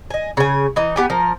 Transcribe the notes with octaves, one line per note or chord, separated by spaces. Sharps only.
D#5 G#5
C#3 G#5
E3 D#4
B3 G4 G#5
F3 A#4